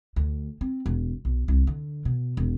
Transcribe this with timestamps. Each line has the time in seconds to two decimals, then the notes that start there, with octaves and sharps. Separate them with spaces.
0.16 D2
0.61 C4
0.86 E1
1.25 B1
1.48 C2
1.67 D3
2.05 B2
2.37 E1